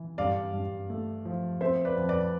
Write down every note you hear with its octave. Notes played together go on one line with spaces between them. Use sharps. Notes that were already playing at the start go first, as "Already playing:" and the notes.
Already playing: E3
G2 D5 F5
G2
A3
F3
C4 C5 E5
B4 D5
F2
B4 D5